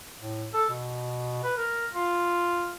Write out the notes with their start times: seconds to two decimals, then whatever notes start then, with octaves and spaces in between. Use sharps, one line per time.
0.20 A2
0.53 A4
0.69 B2
1.43 B4
1.57 A#4
1.94 F4